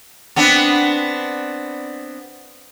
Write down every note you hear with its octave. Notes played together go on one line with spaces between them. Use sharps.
B3 C4 D4